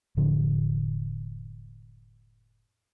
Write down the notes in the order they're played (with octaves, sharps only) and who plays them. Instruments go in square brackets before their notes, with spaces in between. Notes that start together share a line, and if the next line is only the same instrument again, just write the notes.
[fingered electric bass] F1 A2 D3 F3